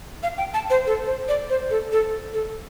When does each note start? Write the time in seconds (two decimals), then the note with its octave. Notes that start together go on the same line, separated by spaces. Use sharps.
0.23 F5
0.38 G5
0.54 A5
0.70 C5
0.87 A4
1.07 C5
1.28 D5
1.50 C5
1.70 A4
1.92 A4
2.34 A4